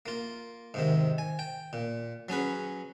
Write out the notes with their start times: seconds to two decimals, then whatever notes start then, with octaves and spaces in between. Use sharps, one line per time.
0.06 A#3 F4
0.74 G#2 C3 D#3
1.18 G#5
1.39 G5
1.73 A#2
2.29 F#3 C#4 G#4 B4